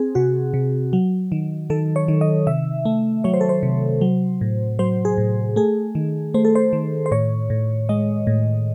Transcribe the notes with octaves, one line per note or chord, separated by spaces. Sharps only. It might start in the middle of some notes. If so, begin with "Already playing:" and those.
Already playing: C4 G#4
C3 F#4
C3
F#3
D#3
D#3 A4
C#5
D#3
D#5
C3 E5
A3
F#3 C#5
C5
A4
C5
C3
F#3
A2
F#3 C5
G#4
A2
A3 G#4
D#3
A3 C5
A4
C5
D#3
C5
A2 C#5
A2
G#3 D#5
A2